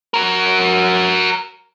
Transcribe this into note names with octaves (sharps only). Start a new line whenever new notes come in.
F#4 A#4